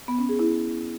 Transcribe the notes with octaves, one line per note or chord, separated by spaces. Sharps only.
B3
C#4
G#4
E4